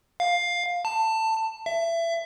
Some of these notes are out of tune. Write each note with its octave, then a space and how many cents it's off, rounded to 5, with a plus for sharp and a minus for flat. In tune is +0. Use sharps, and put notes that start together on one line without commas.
F5 +10
A5 +15
E5 +25